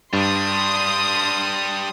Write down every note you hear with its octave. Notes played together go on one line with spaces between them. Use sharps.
G2 G3 D4 C6 D#6